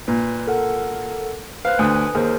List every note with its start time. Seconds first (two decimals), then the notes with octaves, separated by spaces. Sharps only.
0.08 A#2 B4
0.47 A4 A#4 F#5
1.65 B4 C5 F5 F#6
1.79 D2 B4 G#5 D#6
2.15 D#2 G#4 A#4 C5